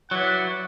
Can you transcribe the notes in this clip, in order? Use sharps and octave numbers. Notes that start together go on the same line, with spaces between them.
F#3 E4 B4 D5 F#5